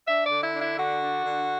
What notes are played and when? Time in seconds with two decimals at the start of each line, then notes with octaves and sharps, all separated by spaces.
0.08 D4 E5
0.26 D5
0.31 D3
0.43 E4
0.55 D4
0.61 E4
0.78 D3 F#4
1.02 D4
1.25 D3